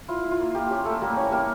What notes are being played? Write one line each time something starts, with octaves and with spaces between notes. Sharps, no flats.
E4 F4
E4
F4
A#3
A#3 G4
C#4 G4
A3 A#3 A4
G3 A#3 A#4
C#4 E4 C#5
G3 A#3 A#4